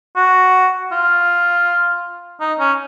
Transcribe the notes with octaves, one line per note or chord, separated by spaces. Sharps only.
F#4
F4
D#4
C#4